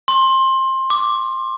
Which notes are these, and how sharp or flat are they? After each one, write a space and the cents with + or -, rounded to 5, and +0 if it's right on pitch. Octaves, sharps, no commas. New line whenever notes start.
C6 +20
D6 -5